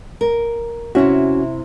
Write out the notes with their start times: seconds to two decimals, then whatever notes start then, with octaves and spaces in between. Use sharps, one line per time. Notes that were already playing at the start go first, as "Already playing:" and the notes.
0.21 A#4
0.95 C3 C#4 E4 F#4